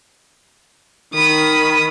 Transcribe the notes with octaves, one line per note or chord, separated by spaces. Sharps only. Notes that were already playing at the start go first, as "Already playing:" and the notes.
D#3 B5 D#6